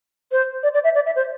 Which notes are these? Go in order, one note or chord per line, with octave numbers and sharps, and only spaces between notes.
C5
D5
D5
E5
D5
E5
C5